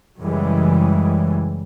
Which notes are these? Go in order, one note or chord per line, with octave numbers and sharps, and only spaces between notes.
F#2 C#3 E3 G3 G#3